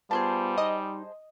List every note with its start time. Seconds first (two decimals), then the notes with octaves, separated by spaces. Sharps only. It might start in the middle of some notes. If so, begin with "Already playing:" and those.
0.11 G3 B3 F4 G#4 C5 A5
0.58 D#4 D#5 D#6